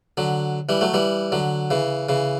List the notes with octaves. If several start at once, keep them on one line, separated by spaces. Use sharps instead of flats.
D3 F#3
E3 G3
F#3 A3
E3 G3
D3 F#3
C#3 E3
C#3 E3